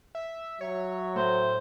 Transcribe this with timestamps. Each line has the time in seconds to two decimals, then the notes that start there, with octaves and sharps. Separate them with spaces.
0.15 E5
0.61 F#3 C#5 E5
1.16 A2 C5